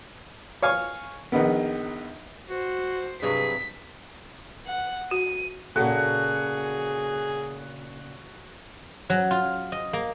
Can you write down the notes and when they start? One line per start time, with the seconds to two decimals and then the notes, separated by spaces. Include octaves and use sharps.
0.62 C#5 F5 G#5 C#6
1.32 A#1 D#3 B3
2.49 F#4 C5
3.22 G2 C3 F#3 G#4 B6
4.67 F#5
5.11 F#4 D#7
5.76 A#2 C#3 F#4 G#4 A4
9.10 F#3
9.31 F4
9.72 D#5
9.93 A#3